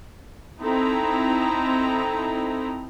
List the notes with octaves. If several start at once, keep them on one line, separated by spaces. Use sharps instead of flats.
C4 D#4 E4 A4 A#5